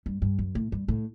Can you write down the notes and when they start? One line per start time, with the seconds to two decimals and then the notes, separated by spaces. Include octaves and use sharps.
0.06 G2
0.22 G2
0.39 F#2
0.55 A2
0.72 G2
0.88 A2